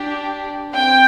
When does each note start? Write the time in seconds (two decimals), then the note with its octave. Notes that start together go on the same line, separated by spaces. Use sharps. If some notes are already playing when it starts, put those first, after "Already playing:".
Already playing: D4 G4
0.75 C4 G5